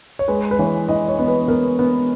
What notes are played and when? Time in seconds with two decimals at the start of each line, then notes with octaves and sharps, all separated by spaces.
0.19 C#5
0.28 G#3 B4
0.51 B4
0.59 E3 C#5
0.88 E3 D#5
1.08 C#5
1.19 B3
1.28 B4
1.48 B3 A#4
1.79 B3